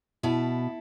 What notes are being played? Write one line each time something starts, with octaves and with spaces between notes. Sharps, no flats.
B2 E4 A4